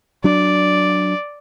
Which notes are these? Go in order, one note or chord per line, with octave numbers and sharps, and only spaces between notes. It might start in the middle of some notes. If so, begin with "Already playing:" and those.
F#3 D4 D5